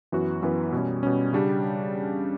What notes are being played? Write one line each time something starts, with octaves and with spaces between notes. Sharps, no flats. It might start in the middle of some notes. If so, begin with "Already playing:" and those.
F#2 E3 B3 F#4 B4
F#2 E3 B3 F#4 B4
B2 G3 C#4
B2 G3 C#4
C#3 G3 D4 G4